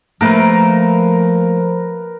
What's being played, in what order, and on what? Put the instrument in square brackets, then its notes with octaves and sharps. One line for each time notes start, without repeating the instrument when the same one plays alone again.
[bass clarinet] F3 [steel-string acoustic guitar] A3 A#3 [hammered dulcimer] A#4 B4